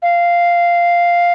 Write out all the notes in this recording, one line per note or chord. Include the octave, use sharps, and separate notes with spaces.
F5